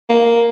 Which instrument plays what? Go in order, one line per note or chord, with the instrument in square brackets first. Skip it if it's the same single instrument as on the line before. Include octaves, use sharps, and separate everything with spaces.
[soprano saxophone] A#3